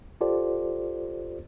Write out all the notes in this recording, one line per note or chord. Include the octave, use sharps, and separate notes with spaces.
F4 G4 A4 C5 D5